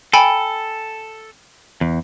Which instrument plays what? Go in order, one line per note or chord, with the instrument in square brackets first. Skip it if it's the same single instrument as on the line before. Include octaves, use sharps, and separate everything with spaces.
[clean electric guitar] A4 [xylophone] G5 G#5 B5
[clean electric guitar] E2